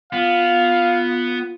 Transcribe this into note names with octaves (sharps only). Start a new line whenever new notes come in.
B3 F4 F5